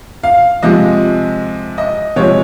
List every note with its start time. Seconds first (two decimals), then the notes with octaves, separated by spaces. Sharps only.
0.23 F5
0.63 C3 F3 G#3 D#5
1.78 D#5
2.16 C3 F3 G#3 C#5